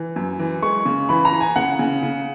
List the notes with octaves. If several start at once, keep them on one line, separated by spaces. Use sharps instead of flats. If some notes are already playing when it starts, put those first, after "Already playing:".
Already playing: E3
F#2
E3
G#3 C#6
C#3
E3 B5
A#5
E3
G#5
C#3 F#5
C#3
C#3